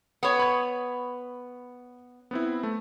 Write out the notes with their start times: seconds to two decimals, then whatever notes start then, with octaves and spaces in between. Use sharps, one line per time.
0.23 B3 C#5
0.39 B5 G#6
2.31 B3 C4 E4
2.63 A3